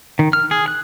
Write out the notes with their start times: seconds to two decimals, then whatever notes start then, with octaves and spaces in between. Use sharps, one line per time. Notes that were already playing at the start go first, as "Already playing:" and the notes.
0.19 D#3
0.33 F6
0.51 G#4
0.68 F#6